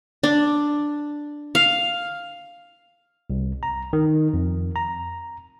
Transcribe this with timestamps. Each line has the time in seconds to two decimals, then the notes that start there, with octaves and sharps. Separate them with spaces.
0.23 D4
1.55 F5
3.30 C2
3.63 A#5
3.93 D#3
4.34 F2
4.76 A#5